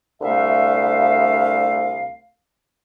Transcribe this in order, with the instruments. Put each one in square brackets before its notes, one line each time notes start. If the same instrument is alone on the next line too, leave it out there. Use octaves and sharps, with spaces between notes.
[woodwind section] C2 D3 A3 E5 F5